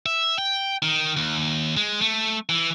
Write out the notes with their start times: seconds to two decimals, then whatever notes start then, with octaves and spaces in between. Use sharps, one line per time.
0.06 E5
0.38 G5
0.82 D#3
1.17 D#2
1.77 G#3
2.01 A3
2.49 E3